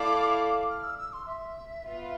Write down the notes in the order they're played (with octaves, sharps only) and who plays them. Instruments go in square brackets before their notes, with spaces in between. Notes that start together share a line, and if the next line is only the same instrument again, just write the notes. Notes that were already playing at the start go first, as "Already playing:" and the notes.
Already playing: [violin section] A3 E4 A4 D5 F5 [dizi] D6
[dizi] F6
E6
E6
C6
E5
[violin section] B3 F4